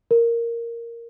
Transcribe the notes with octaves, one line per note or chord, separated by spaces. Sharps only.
A#4